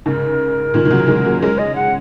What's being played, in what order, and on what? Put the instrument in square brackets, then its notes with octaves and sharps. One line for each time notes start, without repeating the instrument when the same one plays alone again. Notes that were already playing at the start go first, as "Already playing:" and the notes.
[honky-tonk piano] G#2 C#3 [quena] A#4
[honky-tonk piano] A#2 D#3
D#3
C#3 F#3
D#3 G#3
F#3 A#3
[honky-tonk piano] G#3 C#4 [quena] A#4
[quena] D#5
F#5